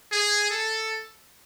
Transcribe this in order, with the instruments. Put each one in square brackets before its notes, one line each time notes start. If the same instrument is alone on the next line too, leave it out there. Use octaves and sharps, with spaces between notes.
[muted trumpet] G#4
A4